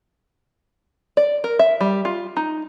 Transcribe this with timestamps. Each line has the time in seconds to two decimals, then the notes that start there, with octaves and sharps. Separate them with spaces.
1.17 D5
1.44 A#4
1.59 E5
1.81 G3
2.05 F4
2.37 D#4